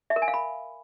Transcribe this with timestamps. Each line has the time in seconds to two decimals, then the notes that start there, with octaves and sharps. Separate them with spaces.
0.10 E5
0.16 A#4
0.22 G#5
0.28 F5
0.34 B5